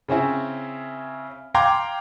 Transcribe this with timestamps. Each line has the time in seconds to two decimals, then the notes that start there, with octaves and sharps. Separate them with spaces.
0.08 C#3 C4 C#4 E4
1.54 F5 G5 A#5 C6 D6 G#6